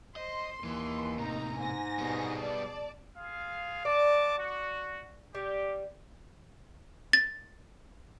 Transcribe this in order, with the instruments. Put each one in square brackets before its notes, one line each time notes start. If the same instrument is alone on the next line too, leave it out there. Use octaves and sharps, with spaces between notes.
[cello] C5 [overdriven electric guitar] D#5 [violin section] C6
[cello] D#2 [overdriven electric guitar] E3
[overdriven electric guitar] A2 C3 [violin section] D#4 A#5
[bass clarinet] G#2 [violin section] G#5 A#6
[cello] B2 G#4 [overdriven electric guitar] G3 B3
[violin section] D5 A5
[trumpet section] F4 G#4 F5
[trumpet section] F#4 A5 D6 [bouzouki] D5
[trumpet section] F#4
[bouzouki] G3 [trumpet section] G4
[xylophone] A6